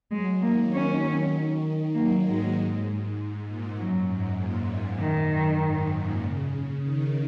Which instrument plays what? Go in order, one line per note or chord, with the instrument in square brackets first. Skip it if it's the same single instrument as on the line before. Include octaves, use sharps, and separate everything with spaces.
[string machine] F#3 [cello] G#3
[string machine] D#3 [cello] A#3
[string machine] D#3 [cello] C#4
[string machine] F#3 [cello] A#3
[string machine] G#2 [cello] G#3
[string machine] G#2
G#2
G#2
A#2
[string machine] F#2 [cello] F#3
[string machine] G#2
A#2
G#2
[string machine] F#2 [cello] D#3
[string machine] G#2
A#2
C#3
D#3